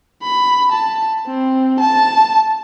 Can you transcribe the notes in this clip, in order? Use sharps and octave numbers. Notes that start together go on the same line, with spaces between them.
B5
A5
C4
A5